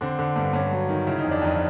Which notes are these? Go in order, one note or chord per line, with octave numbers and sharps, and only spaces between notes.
D3 C4
D3
G2
G2 C#4
F#3
D#3
C#3 E4
D#4
F2
D4
F2 D#4